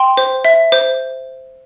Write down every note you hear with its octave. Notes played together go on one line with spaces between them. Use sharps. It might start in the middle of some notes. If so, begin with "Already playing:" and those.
Already playing: G5 C6
C5
E5
C5